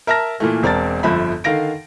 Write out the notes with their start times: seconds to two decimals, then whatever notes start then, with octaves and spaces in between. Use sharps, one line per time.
0.07 A#4 E5 A5 F6 A#6
0.40 A#2 E3 A3
0.63 E1 C4 A#4 D5 A5 A6
1.03 G1 F2 F3 E5 B5
1.44 D3 D#3 F5 A#6 D7